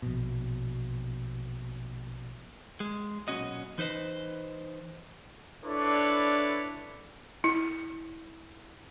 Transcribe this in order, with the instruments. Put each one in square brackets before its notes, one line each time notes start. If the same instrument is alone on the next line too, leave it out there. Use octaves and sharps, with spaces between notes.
[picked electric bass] A#1 B2
[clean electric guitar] G#3
B1 F2 A#2 C#4 F#4 D#5
E3 D#4 B4 C5 D#5
[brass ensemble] D4 E4 A4 B4 C#5 D5
[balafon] E4